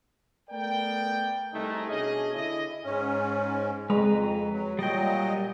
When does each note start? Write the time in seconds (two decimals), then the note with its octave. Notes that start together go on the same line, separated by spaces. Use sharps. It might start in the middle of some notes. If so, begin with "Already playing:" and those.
0.50 A3 B3 A#4 D5 G5
1.53 C2 A3 C4 D#4 G#4 A#4
1.89 B2 C#4 D4 G#4 D#5
2.35 D3 E4 D#5
2.84 G#2 C#4
3.90 F2 G#3 B4 A#5
4.52 F#3
4.79 A#2 F#3 G3 D#5 G5